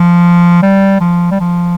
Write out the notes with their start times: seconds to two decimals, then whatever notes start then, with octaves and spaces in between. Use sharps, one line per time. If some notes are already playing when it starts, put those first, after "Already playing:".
Already playing: F3
0.63 G3
1.01 F3
1.32 G3
1.40 F3